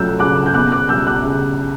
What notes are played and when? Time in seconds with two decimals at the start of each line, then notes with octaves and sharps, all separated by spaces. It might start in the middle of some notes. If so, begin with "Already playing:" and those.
Already playing: C#3 F#3 A3 E6 F#6 G6
0.19 C#3 D6 F#6
0.46 G6
0.54 B3 D6 F#6
0.72 D6 F#6
0.89 G3 E6 G6
1.06 D6 F#6
1.24 C#3